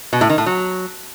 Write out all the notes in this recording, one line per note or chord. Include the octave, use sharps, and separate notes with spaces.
B2
A2
D#3
A2
F#3